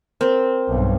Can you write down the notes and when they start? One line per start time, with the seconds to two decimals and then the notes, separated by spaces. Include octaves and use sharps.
0.21 C4 A#4
0.68 B1 G2